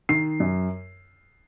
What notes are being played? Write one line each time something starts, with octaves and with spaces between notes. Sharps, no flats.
D#3 C7
F#2